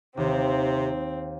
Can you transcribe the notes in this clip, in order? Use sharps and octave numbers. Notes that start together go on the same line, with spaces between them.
D#2 C3 C4